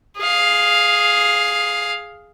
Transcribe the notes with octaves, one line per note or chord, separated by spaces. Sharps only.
G#4 F5